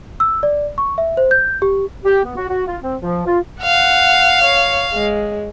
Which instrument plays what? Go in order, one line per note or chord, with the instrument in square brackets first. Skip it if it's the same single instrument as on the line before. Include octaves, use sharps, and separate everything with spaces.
[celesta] E6
D5
C#6
E5
C5
G6
G4
[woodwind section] G4
B3
F#4
F#4
F4
C4
F3
F4
[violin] F5 [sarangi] F#5
[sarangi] C#5
G#3